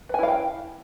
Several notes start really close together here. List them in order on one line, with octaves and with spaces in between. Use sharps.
B4 G#5 E4 F5 G5